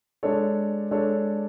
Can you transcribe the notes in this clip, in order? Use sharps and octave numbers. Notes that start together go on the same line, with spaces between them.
G#3 D4 A4 C#5
G#3 D4 A4 C#5